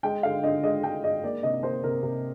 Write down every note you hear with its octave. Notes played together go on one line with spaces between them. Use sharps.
G#3 G5
D3 F5
D3 D#5
G#3 D#5
G#3 G5
G#3 D#5
A#3 D5
C3 D#5
A#3 C5
C3 A#4
C3